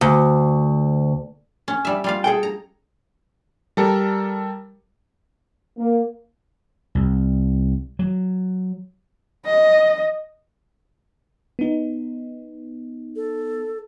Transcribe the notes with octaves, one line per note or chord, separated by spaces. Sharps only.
D2
C#4
G3 E5
G3 F4 F5
G#4 A4 G5
A#5
G3 A4 A#4
A#3
C2
F#3
D#5
B3 D#4
A4